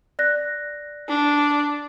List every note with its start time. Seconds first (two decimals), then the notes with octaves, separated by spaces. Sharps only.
0.19 D5 F#6 A#6
1.08 D4